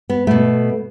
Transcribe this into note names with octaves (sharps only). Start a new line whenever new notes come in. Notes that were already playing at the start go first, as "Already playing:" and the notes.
B3
B2 A3 B3